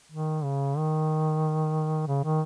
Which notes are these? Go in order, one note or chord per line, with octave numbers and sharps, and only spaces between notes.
D#3
C#3
D#3
C#3
D#3